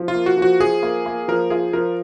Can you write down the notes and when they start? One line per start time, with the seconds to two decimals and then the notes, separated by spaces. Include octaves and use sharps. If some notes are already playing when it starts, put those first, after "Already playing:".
Already playing: F3
0.08 F4
0.14 A#3
0.26 F#4
0.37 F3
0.42 F#4
0.60 F3 G#4
0.83 A#3
1.06 A#3
1.28 F3 A#4
1.50 F4 G#4
1.73 F3 A#4